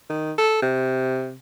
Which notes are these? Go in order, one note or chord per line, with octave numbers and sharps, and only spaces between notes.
D#3
A4
C3